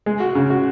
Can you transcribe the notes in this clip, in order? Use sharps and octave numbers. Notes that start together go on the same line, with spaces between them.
G#3
F#4
C#3
F#4